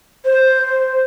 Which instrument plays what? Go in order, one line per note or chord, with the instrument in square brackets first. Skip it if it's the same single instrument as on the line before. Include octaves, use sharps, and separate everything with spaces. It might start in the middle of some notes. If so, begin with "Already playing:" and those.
[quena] C5